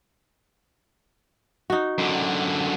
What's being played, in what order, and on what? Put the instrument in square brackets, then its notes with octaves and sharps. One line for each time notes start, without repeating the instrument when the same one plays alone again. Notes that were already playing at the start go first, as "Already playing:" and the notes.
[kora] D#4 F#4
[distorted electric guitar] F#2 D3